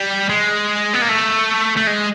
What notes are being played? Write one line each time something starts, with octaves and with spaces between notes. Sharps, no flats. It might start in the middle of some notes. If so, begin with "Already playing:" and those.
Already playing: G3
G#3
B3
A#3
A3
A3
G#3